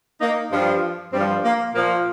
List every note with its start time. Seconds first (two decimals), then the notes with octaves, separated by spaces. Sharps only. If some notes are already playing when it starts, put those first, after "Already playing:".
0.21 A#3 D#4
0.52 G2 F3
1.13 G2 G3 C4
1.18 F3
1.44 A#3
1.74 A#2 F3 A#3